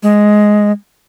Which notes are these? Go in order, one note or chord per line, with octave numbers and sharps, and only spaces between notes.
G#3